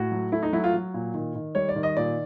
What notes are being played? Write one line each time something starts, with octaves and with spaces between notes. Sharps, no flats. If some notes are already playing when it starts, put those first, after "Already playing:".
Already playing: A2 F#4
F#3
A3 E4
D#4
F#3 E4
F4
F#3
A#2
D#3
D#3
G3 C#5
D5
D#3
D#5
A#2 D5